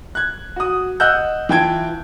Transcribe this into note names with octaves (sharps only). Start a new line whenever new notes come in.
F#6 G#6
F#4 D#6
D#5 F#5 E6 F#6 G6
E3 F4 G5 A5 G#6 D7